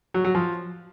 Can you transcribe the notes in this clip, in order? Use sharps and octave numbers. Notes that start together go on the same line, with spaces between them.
F#3
F#3
F3